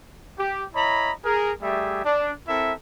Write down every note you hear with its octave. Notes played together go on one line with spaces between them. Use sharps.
G4
E4 C#5 D#5 A#5 B5
G#4 A#4
G3 A3 G4 G#4 E5
D4
C4 E4 A4 A#4 E5